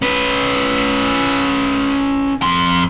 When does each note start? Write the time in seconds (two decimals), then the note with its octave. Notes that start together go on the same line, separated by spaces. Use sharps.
0.02 C#4 B4
2.42 F2 C6